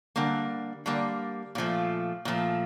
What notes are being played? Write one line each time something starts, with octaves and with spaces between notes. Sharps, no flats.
D3 G3 A#3
D3 G3 A#3
A#2 F3 A3
A#2 F3 A3